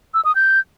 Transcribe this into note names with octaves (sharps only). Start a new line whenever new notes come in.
E6
D#6
G6